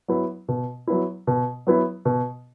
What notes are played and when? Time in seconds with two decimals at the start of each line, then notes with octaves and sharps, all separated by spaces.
0.08 F#3 B3 E4
0.48 B2
0.87 F#3 B3 E4
1.27 B2
1.67 F#3 B3 E4
2.05 B2